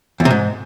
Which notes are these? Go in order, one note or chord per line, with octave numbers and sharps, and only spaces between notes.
E2
C3
G#2